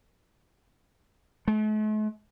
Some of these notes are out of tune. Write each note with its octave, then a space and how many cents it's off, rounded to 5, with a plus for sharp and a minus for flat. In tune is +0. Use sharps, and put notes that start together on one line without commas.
A3 -45